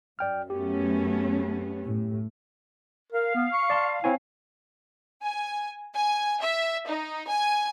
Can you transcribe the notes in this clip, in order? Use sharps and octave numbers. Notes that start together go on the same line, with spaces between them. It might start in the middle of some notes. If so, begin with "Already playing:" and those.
F#2 D5 G5 F6
A3 B3 C#4 G4
A2
A#4 F5
B3
C#6
D5 A5 C6
C4 E4 C#5 G#5
G#5
G#5
E5
D#4
G#5